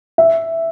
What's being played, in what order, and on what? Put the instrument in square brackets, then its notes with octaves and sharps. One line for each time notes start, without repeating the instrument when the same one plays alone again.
[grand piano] E5